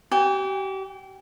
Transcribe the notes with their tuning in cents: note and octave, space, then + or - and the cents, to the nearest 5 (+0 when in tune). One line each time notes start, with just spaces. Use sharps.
G4 -35 G5 +45